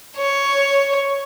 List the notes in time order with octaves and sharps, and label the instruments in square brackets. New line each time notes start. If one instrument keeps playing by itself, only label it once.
[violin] C#5